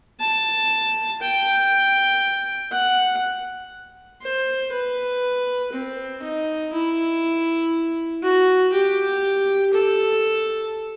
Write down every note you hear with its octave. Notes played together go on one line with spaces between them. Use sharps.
A5
G5
F#5
C5
B4
C4
D#4
E4
F#4
G4
A4